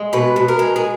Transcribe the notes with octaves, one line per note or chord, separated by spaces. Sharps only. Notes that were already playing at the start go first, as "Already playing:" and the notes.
Already playing: G#3
B2 B4
B2
A#4
G#3
G#4